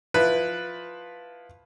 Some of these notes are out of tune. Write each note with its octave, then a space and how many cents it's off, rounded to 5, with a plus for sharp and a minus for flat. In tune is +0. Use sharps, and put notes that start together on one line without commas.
F3 +10 E4 +0 B4 +0